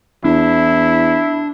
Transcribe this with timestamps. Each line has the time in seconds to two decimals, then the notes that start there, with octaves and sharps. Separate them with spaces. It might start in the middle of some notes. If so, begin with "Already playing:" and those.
0.25 E2 D4 E4